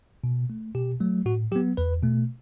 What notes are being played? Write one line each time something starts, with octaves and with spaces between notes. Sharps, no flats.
B2
A3
B2 G4
F#3 A3
A2 F#4
F#3 B3 G4
E2 B4
B2 A3